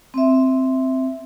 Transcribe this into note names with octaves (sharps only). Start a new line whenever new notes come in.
C4 E5